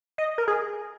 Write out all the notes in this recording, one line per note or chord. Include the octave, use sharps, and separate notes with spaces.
D#5
A#4
G#4